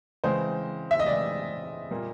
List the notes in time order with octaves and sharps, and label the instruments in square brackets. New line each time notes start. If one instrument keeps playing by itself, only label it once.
[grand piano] C#3 E3 G#3 C4 [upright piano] C5
[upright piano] E5
D#5
[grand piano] C#3 E3 G#3 C4 [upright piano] D5
[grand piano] A#2 G3 A#3